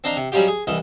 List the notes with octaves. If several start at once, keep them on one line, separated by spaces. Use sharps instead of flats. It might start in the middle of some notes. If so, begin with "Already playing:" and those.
C4 D4 D#5 F5 A#5
C3
F#3 G3 C#4 D#4 F4 G4
G#4
C2 E3 D#5